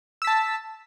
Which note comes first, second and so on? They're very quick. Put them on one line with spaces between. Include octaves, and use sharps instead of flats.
E6 B6 A5